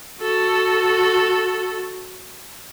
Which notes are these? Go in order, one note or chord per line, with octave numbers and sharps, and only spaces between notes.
F#4 A4